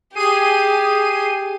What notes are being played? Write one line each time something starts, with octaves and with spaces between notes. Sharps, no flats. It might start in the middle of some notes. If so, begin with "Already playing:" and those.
G4 G#4 C7 D#7